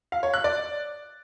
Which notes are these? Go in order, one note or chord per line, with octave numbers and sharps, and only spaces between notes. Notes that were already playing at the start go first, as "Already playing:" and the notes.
F5
C#5
F#6
D5